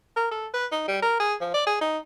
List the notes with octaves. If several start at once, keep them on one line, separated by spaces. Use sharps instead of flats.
A#4
A4
B4
D#4
G3
A#4
G#4
F3
D5
G#4
D#4